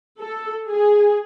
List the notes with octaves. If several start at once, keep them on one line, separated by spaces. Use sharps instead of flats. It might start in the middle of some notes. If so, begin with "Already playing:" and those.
A4
G#4